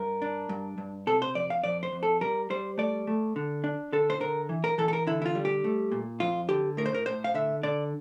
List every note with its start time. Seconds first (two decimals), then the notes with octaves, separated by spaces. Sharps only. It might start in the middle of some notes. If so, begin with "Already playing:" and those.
Already playing: G2 A#4
0.22 D4
0.49 G2
0.78 G2
1.07 C3 A4
1.22 C5
1.35 F2 D5
1.50 F5
1.64 F2 D5
1.83 C5
1.92 F2
2.03 A4
2.21 G3 A#4
2.50 G3 C5
2.78 A3 D5
3.07 A3
3.36 D3
3.64 D4
3.93 D3 A4
4.10 C5
4.20 D3 A#4
4.49 E3
4.64 A#4
4.78 E3 A4
4.88 A4
4.93 A#4
5.07 D3 E4
5.22 E4
5.26 F4
5.35 G3
5.45 G4
5.64 A3
5.92 A#2
6.20 F2 F4
6.49 D3 G4
6.77 A2 A#4
6.86 C5
6.94 A#4
7.06 A2 C5
7.24 F5
7.34 D3 E5
7.63 D3 D5